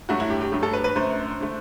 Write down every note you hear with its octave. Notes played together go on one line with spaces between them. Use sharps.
G2 F#3 A3 F#4
E4
G4
G4
G2 F#3 A3 G4
A4
B4
B4
F#2 D3 A3 C5
D3 A3